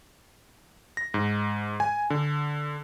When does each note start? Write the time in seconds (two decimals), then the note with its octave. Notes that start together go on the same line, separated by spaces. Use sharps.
0.97 A#6
1.14 G#2
1.80 G#5
2.10 D3